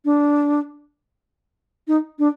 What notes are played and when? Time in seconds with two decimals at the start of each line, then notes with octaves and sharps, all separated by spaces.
0.05 D4
1.88 D#4
2.19 D4